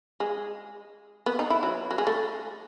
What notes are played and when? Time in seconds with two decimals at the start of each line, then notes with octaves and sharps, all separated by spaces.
0.20 G#3
1.26 B3
1.39 D#4
1.50 E4
1.63 F#3
1.91 F#3
1.98 G#3
2.07 A3